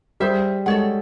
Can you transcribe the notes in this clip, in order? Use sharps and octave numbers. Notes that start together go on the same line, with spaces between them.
G3 G#4 C5 E5
G#3 A4 C#5 F#5